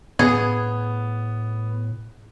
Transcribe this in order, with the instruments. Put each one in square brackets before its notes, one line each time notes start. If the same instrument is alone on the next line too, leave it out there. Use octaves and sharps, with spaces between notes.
[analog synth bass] A2 [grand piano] B3 [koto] G#4